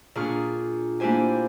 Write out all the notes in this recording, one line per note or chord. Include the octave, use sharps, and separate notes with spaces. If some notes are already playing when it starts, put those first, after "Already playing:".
A#2 D4 G#4 C#6 F6 G6
A#3 D4 E4 G4 C5 G#5